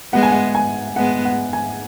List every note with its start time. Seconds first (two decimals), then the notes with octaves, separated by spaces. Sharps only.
0.13 G#3 B3 F#5
0.23 G#5
0.32 F#5
0.55 G#5
0.96 G#3 B3 F#5
1.25 F#5
1.53 G#5